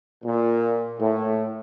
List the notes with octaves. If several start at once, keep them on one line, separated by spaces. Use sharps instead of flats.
A#2
A2